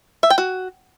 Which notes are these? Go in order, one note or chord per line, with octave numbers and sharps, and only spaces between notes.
E5
G5
F#4